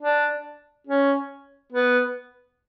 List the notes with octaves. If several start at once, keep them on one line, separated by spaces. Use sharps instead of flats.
D4
C#4
B3